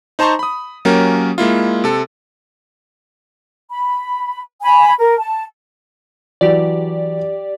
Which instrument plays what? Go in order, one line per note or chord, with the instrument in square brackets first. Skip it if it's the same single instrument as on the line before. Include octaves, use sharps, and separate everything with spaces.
[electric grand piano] D#4 C5 A5 A#5 C6 C#6
B5 D#6
F#3 A#3 C#4 G4 A#4
G#3 A#3 E4 F4
C3 A4
[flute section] B5
G#5 B5
A#4
A5
[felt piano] E3 F#3 [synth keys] G4 D5